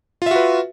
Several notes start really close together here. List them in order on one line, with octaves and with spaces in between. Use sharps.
F4 E5 F#4 B4